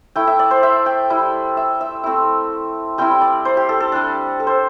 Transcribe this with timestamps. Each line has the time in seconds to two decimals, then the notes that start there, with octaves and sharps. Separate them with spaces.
0.16 A3 E4 G5
0.27 E5
0.39 D5
0.51 C5
0.63 E5
0.86 G5
1.10 G3 E4
1.57 E5
1.81 E5
2.03 A3 C4 E4
2.98 G3 C4 E4 G5
3.21 D5
3.45 C5
3.57 G4
3.69 A4
3.80 A4
3.92 G3 D4
4.40 A4
4.47 C5